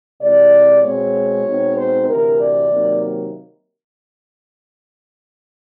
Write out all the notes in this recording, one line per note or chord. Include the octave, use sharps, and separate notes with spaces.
C3 E3 G#3 D5
B2 G#3 C4 C#5
B2 G#3 C4 D#4
C5
D2 C3 E3 A#4
D5
C3 D#3 F#3 A#3